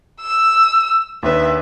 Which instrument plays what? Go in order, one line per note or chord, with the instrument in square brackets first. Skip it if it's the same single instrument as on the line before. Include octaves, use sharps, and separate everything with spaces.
[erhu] E6
[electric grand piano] D#2 D4 B4 [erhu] E5